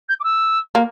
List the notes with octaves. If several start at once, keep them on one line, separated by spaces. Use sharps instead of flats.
G6
D6
E6
A#3